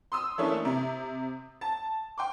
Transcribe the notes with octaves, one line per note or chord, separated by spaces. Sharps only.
C6 D#6 E6
E3 A3 A#3 C#4 D4 E4
C3
A5
G5 C6 D6